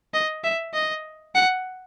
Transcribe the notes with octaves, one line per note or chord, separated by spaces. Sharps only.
D#5
E5
D#5
F#5